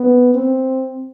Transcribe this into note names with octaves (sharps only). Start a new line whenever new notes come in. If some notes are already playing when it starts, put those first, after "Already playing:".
Already playing: B3
C4